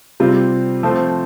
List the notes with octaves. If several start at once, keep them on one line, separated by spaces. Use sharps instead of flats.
C3 G3 C4 F4
F3 A3 C4